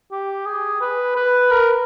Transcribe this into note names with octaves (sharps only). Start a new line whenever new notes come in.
G4
G#4
B4
B4
A#4